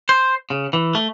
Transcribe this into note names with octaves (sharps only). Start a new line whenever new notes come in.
C5
C#3
E3
A3